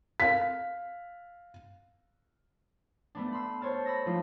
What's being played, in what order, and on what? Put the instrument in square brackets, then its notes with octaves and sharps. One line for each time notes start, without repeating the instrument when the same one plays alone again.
[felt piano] F5 B6
[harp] A3 B3 D4
B5 C6 E6
C5 C#5 A5 F6
B5 E6 A#6
F3 A3 D#4 F4